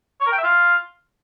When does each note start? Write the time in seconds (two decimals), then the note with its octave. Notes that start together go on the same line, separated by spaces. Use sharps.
0.21 C#5
0.26 A#4
0.32 G5
0.38 E5
0.43 F4